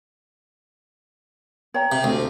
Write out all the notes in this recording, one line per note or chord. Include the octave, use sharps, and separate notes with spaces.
C#5 G5 A#5
C3
D2